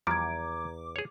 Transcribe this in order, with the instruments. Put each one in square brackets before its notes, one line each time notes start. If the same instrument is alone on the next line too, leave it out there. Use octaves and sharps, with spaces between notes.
[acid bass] E2 [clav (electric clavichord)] F3 G3 [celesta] A#5 G#6 [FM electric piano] D6
[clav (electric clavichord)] G#4 C#5